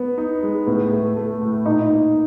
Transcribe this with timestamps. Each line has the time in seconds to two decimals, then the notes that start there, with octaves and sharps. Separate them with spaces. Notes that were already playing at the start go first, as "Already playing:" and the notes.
Already playing: B3
0.18 D#4
0.43 G#3
0.67 A2 B3
0.92 A3
1.17 A3
1.42 A2
1.65 A#2 D#4
1.90 A#3